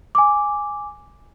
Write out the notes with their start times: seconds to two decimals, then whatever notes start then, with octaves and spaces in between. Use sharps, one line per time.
0.15 G#5 D6